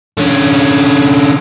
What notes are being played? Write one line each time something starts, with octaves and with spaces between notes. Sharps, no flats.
D3 C#4